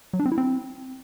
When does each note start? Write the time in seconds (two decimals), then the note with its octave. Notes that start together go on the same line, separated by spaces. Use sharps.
0.13 F#3
0.19 D4
0.26 C4
0.32 E4
0.38 C4